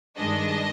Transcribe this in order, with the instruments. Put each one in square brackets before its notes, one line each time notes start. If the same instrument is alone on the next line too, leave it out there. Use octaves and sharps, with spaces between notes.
[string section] G2 D#3 G#3 D4 D#5